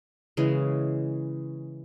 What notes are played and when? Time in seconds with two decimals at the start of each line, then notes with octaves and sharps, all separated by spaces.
0.37 C#3 E3 G#3